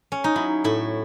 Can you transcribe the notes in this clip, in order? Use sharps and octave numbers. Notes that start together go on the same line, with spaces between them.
C#4
D#4
F#3 E4
A2 E4